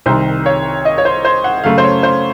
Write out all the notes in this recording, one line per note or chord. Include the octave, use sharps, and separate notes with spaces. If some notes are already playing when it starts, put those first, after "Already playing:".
C2 C3 D#3 C5
C#5
D#5
C#5
C5
C5
F#5
F#2 C#3 A3 F5
C5
C#5
C5